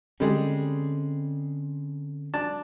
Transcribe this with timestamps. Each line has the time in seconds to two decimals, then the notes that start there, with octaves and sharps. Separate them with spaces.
0.20 D3 G3 G#3 C4 C#4 G#4
2.34 D4 A5